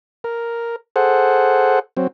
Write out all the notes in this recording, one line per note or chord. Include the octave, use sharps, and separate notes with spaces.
A#4
G#4 A4 C5 F#5
F#3 C4